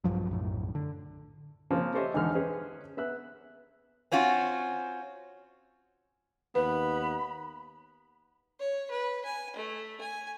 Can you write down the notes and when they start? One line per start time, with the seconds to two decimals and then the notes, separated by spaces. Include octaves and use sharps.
0.04 A#1 G2 F3 F#3
0.29 B1 F#2 A2
0.75 D3
1.70 C#3 F3 A#3 C4
1.94 G4 A4 C5 C#5 D#5 E5
2.14 G#1 E2 D3 D#4 F6
2.35 C#4 G#4 B4 C5
2.97 B3 E5 F#6
4.12 C4 C#4 F4 F#4
6.55 D#2 B3 B4 B5
8.60 C#5
8.91 B4
9.25 G#5
9.56 A3
10.01 G#5